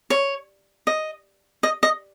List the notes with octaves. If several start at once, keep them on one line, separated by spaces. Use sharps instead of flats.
C#5
D#5
D#5
D#5